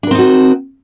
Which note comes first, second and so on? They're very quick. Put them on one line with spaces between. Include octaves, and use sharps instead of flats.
D4 A#4 C4 D#4 F#4